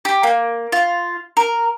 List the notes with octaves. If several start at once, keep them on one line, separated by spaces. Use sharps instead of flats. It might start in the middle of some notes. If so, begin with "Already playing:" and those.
G4
A#3
F4
A#4